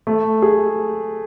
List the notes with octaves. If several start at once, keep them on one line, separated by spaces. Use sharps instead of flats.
A3
G#4